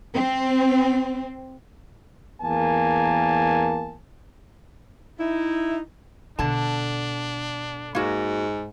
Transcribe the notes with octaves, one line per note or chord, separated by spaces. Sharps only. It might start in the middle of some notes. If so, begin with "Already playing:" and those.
C4
E2 A#3 A#4 G#5 A5
D#4 E4
B2 D3 D4 A5
G#2 A#3 F#4